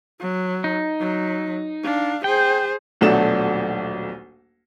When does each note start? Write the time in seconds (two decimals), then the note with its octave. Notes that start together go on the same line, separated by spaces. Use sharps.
0.20 F#3
0.64 D#4
0.99 F#3
1.83 D4 F5
2.24 G#4 C5 G5
3.01 D#1 B1 F#3 A3 D4 E7